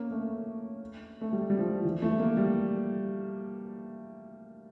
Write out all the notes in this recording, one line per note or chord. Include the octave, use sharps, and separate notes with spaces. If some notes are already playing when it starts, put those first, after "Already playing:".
Already playing: A#3 C#4
A3
A3
G3
G3
F3
E3
A3
A#3
G3